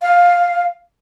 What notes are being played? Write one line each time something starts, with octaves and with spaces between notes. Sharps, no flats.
F5